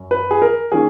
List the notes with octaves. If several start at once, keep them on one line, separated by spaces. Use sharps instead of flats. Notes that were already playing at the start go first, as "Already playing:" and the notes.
Already playing: F#2
B4
G#4
A#4
D#3 A#3 C#4 G#4